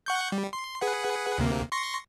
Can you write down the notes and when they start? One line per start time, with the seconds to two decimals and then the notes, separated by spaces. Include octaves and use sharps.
0.06 F#5 C#6 G6
0.32 G3
0.53 C6
0.81 G#4 B4 F#5
1.38 D2 C3 A#3
1.72 C6 C#6 A#6